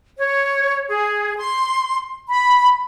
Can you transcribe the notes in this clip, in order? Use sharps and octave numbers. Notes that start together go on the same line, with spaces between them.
C#5
G#4
C6
B5